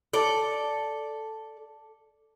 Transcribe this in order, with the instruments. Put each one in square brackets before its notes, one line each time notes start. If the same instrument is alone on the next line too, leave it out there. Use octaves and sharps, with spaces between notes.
[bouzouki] A4 D5